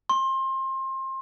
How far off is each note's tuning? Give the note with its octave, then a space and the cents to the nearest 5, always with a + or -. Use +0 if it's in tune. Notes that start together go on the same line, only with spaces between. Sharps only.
C6 +25